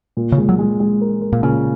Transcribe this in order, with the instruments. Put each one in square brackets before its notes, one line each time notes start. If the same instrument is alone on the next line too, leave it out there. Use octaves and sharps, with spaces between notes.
[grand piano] A#2
[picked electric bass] C#3
[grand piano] G#3
[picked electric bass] F#3
[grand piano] G#3
G#3
A#4
A#4
[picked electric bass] A#2
[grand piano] A#2 [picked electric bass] C#3